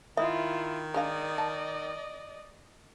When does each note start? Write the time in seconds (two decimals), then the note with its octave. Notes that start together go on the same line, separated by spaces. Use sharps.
0.17 D#3 E4 F4 D#5 E5
0.94 G#3 D4 D5 D#5 F5
1.38 A5